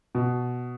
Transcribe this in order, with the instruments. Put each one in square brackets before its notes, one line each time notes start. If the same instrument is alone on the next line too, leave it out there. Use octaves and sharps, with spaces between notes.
[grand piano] B2